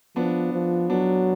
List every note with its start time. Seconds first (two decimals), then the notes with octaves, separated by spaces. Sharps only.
0.16 F3 B3 D4
0.53 F3
0.90 F#3 B3 D4